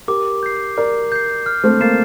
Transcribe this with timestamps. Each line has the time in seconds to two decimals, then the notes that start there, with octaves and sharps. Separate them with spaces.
0.08 G4 A#4 D6
0.43 G6 C7
0.77 A#4 D5 D6
1.12 G6 C7
1.46 F6
1.64 A3 C4
1.80 A#3 A6 C7 E7